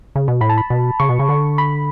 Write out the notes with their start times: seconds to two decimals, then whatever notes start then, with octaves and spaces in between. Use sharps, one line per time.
0.16 C#3
0.28 B2
0.41 A2 B5
0.49 A5
0.58 B5
0.70 B2
1.00 C#3 C#6
1.09 B2
1.19 C#3
1.29 D3
1.58 B5